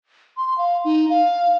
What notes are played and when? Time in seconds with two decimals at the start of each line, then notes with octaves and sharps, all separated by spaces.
0.37 C6
0.58 F5
0.85 D#4
1.10 F5